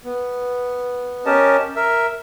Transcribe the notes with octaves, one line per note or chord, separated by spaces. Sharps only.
B3
C#4 G4 A#4 D#5 A5
A#4 E5